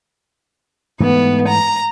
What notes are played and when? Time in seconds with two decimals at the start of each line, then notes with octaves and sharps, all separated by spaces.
1.00 G#2 E3 A3 B3
1.49 A#5